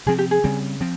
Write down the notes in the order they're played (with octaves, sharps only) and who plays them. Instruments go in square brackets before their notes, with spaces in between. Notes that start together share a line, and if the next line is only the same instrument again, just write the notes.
[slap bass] C3 F3 C4 [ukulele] G#4
[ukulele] G4
G#4
[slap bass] C#3 G3 C4
F3 C4